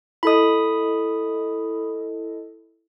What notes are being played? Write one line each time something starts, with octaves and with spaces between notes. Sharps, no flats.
E4 A4 D#5 B5 D#6